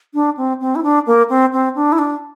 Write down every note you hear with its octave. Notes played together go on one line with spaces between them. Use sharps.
D4
C4
C4
E4
D4
A#3
C4
C4
D4
E4
D4